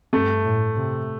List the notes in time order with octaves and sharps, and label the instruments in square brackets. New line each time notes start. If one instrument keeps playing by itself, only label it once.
[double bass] G2 [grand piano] A3
[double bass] A2
C3